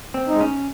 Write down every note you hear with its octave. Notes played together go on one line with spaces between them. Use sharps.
C4
G#3 D#4
C#4